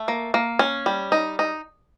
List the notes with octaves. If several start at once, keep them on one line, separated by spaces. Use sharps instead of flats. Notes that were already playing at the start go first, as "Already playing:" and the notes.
Already playing: A3
A#3
A#3
C#4
G3
D#4
D#4